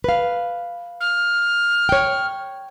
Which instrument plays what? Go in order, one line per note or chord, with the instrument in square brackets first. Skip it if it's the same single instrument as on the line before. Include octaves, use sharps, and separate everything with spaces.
[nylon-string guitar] B4 F5
[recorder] F6
[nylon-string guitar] C#5 G5